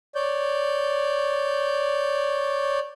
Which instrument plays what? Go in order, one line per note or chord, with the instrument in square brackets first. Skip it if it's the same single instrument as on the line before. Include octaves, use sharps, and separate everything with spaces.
[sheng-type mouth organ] C#5 D5 G6